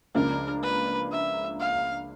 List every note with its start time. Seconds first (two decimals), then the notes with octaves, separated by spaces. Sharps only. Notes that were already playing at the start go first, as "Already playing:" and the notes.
0.15 C#2 C#3 F3 A#3 D4 A#4
0.63 B4
1.12 E5
1.60 F5